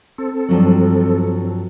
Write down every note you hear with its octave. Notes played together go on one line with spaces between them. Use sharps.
C4 A4
G2 F3 F#3